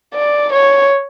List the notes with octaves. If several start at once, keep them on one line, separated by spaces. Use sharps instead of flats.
D5
C#5